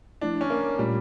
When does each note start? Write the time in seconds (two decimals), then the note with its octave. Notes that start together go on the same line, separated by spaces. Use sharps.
0.21 F3 A3 D4 E4
0.41 C#4
0.50 A#3
0.79 A#2 G3 A3 C#4 F4